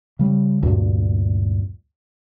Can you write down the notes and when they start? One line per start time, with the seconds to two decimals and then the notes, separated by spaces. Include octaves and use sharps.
0.19 C#3 G3
0.63 D2 G2 A#2